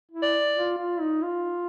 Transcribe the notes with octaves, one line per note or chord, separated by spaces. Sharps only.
E4
D5
F4
F4
D#4
F4